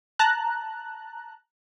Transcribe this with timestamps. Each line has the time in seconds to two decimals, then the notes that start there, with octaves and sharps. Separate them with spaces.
0.19 A5 A#5 F#6